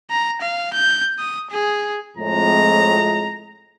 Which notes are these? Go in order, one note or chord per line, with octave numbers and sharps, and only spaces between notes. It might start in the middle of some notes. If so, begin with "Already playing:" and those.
A#5
F5
G6
D#6
G#4
F2 A2 G#3 A#5